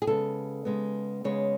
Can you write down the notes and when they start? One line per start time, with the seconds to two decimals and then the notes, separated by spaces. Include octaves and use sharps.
0.02 G#4
0.07 C#3 G#3 B3 A4
0.65 C#3 G#3 B3
1.24 C#3 G#3 B3 C#5